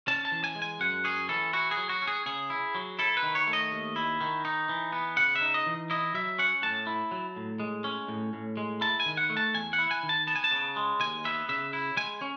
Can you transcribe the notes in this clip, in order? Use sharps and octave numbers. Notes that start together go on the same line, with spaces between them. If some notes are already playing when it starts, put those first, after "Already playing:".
C#4 A5
A5
E3
G#5
G#3
G#5
F#2 F#5
C#4 G#4
E3 A4
E4 F#4
G#4
F#3
F#4
C#4
G#4
C#3 G#4
E4
F#3
E4 A4
B4
D#3
C#5
A3
D#5
D#2
E4
D#3
D#4
E3
B3
C#3 F#5
E5
D#4
D#5
E3
E4 D#5
F#3 E5
C#4 F#5
A2 A5
E4
F#3
A2
G#3
C#4
A2
A2
G#3
E4 A5
G#5
D#3
F#5
A3
A5
E2 G#5
F#5
E4
G#5
D#3
A5
B3 A5
G#5
A5
C#3
G#3
D#2 G#5
B3 E5
C#3 E5
E4
G#3 G#5
C#4